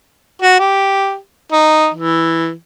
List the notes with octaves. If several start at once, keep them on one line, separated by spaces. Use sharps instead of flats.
F#4
G4
D#4
E3